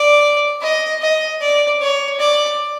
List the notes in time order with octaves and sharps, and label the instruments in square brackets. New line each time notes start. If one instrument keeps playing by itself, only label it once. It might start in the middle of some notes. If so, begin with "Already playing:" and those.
Already playing: [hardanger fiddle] D5
D#5
D#5
D5
C#5
D5